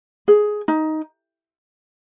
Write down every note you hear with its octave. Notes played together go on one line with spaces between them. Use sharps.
G#4
D#4